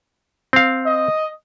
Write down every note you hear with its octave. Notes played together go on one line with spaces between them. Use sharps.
C4 F5
D#5